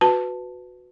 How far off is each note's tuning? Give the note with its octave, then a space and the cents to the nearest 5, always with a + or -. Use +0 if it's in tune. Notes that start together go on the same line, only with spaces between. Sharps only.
F#4 -15 B4 +10 A5 +0